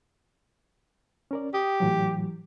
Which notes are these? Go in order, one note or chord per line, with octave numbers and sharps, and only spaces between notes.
C#4 A#4 D5
G4 D#6
A2 E3 F#3